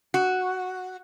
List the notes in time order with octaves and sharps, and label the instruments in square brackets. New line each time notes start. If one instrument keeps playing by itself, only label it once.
[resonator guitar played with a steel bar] F#4